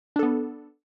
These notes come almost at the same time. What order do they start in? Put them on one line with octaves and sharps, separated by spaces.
D4 A4 B3